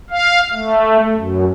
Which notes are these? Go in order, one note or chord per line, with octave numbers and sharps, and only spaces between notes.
F5
A3
F#2